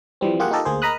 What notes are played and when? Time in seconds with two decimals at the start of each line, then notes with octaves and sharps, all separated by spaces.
0.21 E3 F3 G3 C4
0.39 A#3 F4 G4 G#4 F#5
0.51 D#4 F4 G4 A4 A#4 D#5
0.65 D2 A#3 G#4 C5
0.82 A#4 D#5 A#5 B5 D#6 F#6